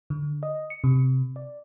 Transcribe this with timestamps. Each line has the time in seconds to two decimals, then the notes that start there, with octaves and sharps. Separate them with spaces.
0.10 D3
0.43 D#5
0.70 C#7
0.84 C3
1.36 D5